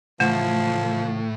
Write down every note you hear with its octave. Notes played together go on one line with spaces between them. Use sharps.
A2 C#3 E3 F3 A3